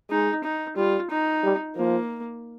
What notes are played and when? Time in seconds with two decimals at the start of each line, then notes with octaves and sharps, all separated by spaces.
0.10 G#3 D#4
0.44 D#4
0.76 G3 F4
1.10 D#4
1.43 G3
1.76 F3 A#3